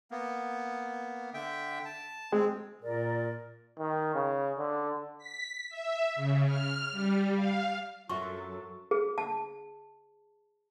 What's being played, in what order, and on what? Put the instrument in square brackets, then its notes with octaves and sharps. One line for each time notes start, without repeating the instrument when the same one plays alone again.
[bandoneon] A#3 B3
D3 E5 G5
A5
[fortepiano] G#3 [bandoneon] C4
[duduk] A#2 [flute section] A#4 D5
[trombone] D#3
C#3
D3
[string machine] B6
E5
C#3
F6
G3
F5
[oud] F#2 [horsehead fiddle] F#3 A4 [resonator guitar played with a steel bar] F4 F#4 E5 [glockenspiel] C#6
[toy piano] G#4
A5